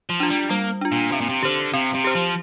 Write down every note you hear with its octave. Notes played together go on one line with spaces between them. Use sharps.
F3
D4 F4
G3
G3 A#3
D4 F4
A#2
C3 C4
A#2
C3
D3 G4 C5
C3 C4
C3
G4 C5
F3